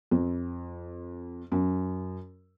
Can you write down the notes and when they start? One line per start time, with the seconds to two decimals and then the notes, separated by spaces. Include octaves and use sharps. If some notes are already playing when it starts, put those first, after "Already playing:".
0.11 F2
1.52 F#2